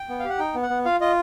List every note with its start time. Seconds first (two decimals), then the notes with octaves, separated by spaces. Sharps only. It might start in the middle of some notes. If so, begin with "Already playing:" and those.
Already playing: G5
0.09 B3
0.19 G4 F5
0.29 F#5
0.39 D#4 G5
0.55 B3
0.62 F#5
0.70 B3
0.85 F4 F5
1.01 F4 D#5